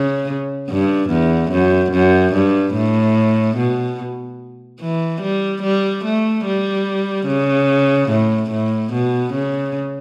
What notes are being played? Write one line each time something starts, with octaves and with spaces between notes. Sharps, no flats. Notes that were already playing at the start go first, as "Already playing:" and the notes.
Already playing: C#3
G2
E2
F#2
F#2
G2
A2
B2
E3
G3
G3
A3
G3
C#3
A2
A2
B2
C#3